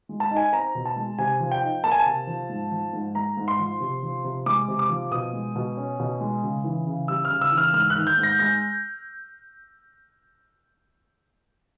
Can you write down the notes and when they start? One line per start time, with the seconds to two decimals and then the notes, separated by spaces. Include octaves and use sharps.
0.09 G#3
0.20 A5
0.31 D#4
0.37 G#5
0.52 C4 A#5
0.75 B2
0.86 A5
0.96 G#3
1.18 C3 G#5
1.40 F3
1.52 G5
1.62 D#4
1.84 A#3 A5
1.92 G#5
2.00 A5
2.06 C3
2.27 F3
2.49 G#2
2.71 F3
2.93 G#2
3.15 G#3 A#5
3.37 G#2
3.48 C6
3.59 F3
3.80 C3
4.03 F3
4.24 C3
4.46 G#3 D6
4.68 C3
4.79 D6
4.90 F3
5.11 B2 D#6
5.33 G#3
5.56 B2
5.77 C#4
6.00 B2
6.21 G#3
6.43 C#3
6.64 E3
6.87 C#3
7.08 G3 E6
7.25 F6
7.30 C#3
7.41 E6
7.52 E3
7.58 F6
7.74 G#2 F6
7.90 F#6
7.95 D#3
8.07 G6
8.18 G#2
8.23 A#6
8.39 G#3 A#6